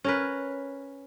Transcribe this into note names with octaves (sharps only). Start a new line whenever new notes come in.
C#4 A#4 B4